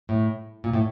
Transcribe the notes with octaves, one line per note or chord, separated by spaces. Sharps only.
A2
A#2
A2